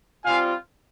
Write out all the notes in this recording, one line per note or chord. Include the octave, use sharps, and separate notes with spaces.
G3 C4 F4 F5 G#5